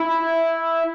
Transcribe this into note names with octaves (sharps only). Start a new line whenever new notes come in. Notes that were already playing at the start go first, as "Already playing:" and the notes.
Already playing: E4